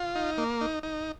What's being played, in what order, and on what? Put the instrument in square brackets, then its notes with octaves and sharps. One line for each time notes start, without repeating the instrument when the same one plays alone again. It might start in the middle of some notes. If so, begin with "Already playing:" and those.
Already playing: [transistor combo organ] F4
D#4
A#3
D#4
D#4